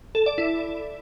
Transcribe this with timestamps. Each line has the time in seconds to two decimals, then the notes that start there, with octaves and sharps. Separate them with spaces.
0.15 A4
0.26 D5
0.38 E4